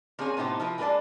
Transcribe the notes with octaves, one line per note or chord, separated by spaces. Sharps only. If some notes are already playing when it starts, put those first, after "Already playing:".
A#3 C4 G#4 B4 C#5 G#5
A2 C3 B3 D#4 G4 C5
F3 E4 A#4 B4
G#3 A#3 D4 B4 D5 A5